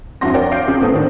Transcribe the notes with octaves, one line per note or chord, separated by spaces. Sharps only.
F1 G2 E4 F#4 C6 A#6
A#4 C#5 D5 F#5 G5
F5 D6 G6 C7 D7
C#2 C#3
A2 B3 C4 A4 D#6
D3 D#3 C4 D4